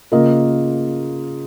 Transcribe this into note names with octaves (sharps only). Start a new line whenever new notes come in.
C#3 A#3 F4 A#4 D#5